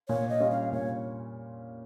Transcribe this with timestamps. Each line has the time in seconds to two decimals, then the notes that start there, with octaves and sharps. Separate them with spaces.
0.09 A#2 C#5
0.29 D#5
0.40 G3 C#4 F4
0.51 F5
0.72 A#2 C#5